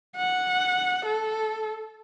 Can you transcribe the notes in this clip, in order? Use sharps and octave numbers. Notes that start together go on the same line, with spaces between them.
F#5
A4